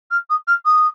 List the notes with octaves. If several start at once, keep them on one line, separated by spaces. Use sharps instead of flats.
F6
D#6
F6
D#6